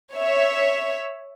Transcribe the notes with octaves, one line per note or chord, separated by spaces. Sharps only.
C#5 E5